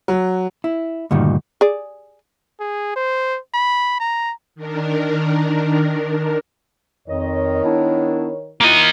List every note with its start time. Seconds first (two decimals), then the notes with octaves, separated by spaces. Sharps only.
0.08 F#3
0.64 E4
1.11 D2 G2 A#2 D#3
1.61 G#4 D5
2.60 G#4
2.96 C5
3.54 B5
4.00 A#5
4.55 D#3 D4 A#4
7.08 F2 D#3 A#4 C#5 D#5
7.63 B3 D4 E4
8.61 A#3 D4 E4 F4 D#5